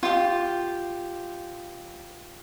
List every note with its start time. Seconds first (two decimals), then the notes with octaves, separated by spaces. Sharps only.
0.03 F4 G4